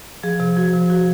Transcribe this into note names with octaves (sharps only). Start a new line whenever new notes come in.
F3 G#4
C3
F3 F#4
C3
F3 F#4